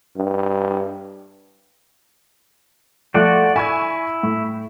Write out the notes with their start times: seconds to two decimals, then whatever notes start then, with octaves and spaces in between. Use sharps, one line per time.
0.16 G2
3.14 F3 A3 F#4 D5 F#5
3.56 E4 G#5 C#6 G#6
4.23 A2